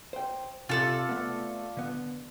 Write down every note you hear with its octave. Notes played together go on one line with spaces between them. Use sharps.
C5 G5
C3 F4 A4 D5
A3 B3
D3 B3